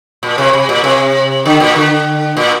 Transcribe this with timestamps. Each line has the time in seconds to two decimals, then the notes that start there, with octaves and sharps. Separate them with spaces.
0.23 A#2
0.38 C3
0.53 C3
0.69 A#2
0.84 C3
1.46 D3
1.60 A#2
1.76 D3
2.37 A#2